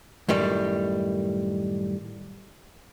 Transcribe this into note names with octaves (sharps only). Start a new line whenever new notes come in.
F#2 A2 D#3 G3